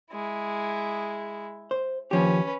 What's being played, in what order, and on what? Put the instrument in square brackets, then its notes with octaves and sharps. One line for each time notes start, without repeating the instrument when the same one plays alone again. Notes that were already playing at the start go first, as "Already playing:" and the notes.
[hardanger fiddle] G#3 E4
[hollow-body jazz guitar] C5
[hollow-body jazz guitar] D#2 F3 G4 [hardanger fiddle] C#4 B4